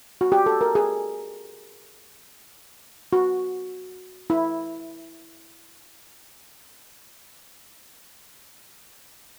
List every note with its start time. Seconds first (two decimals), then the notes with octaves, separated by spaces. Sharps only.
0.21 F#4
0.32 G4
0.46 A4
0.61 A#4
0.75 G#4
3.13 F#4
4.30 E4